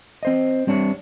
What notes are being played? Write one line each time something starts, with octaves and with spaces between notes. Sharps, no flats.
C4 C5 D#5
G3 C4 D4 C#5